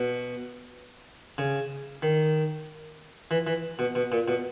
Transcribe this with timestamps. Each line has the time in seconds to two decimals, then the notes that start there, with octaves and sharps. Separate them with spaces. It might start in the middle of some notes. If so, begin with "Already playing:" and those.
Already playing: B2
1.38 C#3
2.02 D#3
3.31 E3
3.47 E3
3.79 B2
3.95 B2
4.12 A#2
4.28 B2